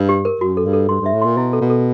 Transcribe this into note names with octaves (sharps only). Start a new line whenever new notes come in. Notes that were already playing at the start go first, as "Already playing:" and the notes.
Already playing: G2
G4
A#4
F#2 F#4
A4
G2
A4
G2 C6
G2 E5
A2
A#2 C6
B2 E4
A4
B2
A4